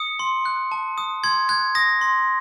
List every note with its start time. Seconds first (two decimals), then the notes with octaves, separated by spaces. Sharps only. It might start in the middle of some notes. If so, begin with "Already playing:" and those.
Already playing: D#6 C#7
0.19 C6
0.45 F#6
0.72 A5
0.98 D#6
1.24 C6 G#6
1.49 F#6 G#6
1.75 D#6 A#6
2.01 C6